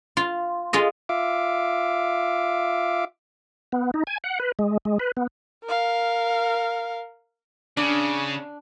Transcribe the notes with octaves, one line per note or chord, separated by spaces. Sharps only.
F4
G#3 F4 D#5
F4 E5 F5 D6
B3
D#4
G#5
F#5
B4
G#3
G#3
B4
B3
A#4 F5
C#3 D4